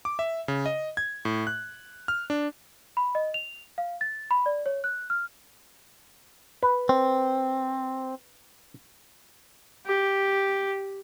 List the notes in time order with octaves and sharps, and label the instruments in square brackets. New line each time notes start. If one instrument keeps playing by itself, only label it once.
[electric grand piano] D6
E5
C#3
D#5
G#6
A2
F#6
F6
D4
[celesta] B5
D#5
F7
F5
A6
B5
D5
C#5
F#6
F6
[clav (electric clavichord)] B4
[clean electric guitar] C4
[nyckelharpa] G4